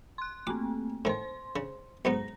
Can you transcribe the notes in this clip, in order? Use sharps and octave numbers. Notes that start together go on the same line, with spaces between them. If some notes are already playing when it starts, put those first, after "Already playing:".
C6 F#6
A3 A#3 C4 D6
A2 D#3 C5 C6
C#3
B1 G#2 B3 A#5 A#6